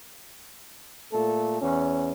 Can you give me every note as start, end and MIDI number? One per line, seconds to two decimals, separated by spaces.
1.13 1.58 46
1.13 1.58 57
1.13 1.58 69
1.61 2.12 40
1.61 2.12 61